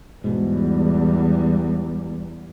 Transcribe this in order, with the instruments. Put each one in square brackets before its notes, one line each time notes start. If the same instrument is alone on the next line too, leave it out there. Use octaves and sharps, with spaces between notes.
[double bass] E2 G3 [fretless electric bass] G#2 B2